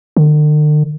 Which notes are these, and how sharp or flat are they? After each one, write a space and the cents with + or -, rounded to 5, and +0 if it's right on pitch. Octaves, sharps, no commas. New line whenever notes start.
D3 +45